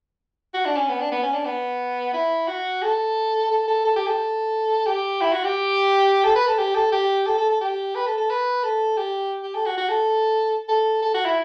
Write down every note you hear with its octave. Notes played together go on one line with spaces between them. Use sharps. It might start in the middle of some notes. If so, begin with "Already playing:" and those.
F#4
D4
C#4
B3
D4
B3
C#4
D4
B3
E4
F#4
A4
A4
A4
A4
G4
A4
G4
E4
F#4
G4
A4
B4
A4
G4
A4
G4
A4
A4
A4
G4
B4
A4
A4
B4
A4
G4
G4
A4
F#4
F#4
A4
A4
A4
F#4
E4